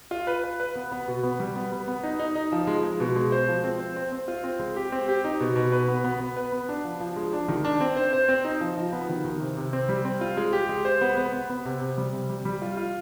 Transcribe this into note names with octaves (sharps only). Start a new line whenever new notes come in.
F4
B4
B4
B4
B3
B3
B2
B3
G3
B3
B3
B3
D#4
D#4
D#4
F3
G#3
G#3
B2
G#3
C5
F3
C4
C5
C4
C4
F4
C4
G#3
G4
C4
G4
D#4
B2
B2
B4
B3
B3
B3
B4
B3
D4
F3
F3
G#3
D4
D#3
D4
C4
C5
C5
C4
D#4
F3
F3
B3
D#3
D#3
C3
C3
C4
G3
C4
F4
G#3
G4
G#3
C5
B3
B3
B3
B3
C3
C3
G3
C3
G3
G3
F4
F4